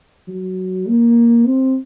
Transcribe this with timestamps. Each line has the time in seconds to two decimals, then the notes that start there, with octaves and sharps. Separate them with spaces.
0.27 F#3
0.86 A#3
1.45 C4